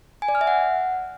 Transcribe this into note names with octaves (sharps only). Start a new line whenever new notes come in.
G#5
D5
F6
E5
F#5